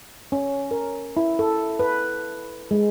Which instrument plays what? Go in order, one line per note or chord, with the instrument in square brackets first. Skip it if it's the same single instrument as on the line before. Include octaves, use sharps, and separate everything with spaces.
[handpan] C#4
A#4
E4
A4
B4
G#3